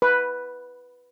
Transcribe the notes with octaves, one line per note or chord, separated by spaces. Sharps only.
B4